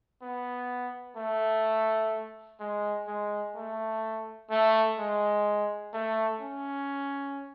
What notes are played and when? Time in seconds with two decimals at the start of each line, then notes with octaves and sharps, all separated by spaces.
0.22 B3
1.17 A3
2.60 G#3
3.07 G#3
3.55 A3
4.50 A3
4.98 G#3
5.93 A3
6.41 C#4